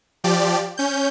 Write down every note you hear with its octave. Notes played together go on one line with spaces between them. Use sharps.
F3 G4 D5
C#4 G6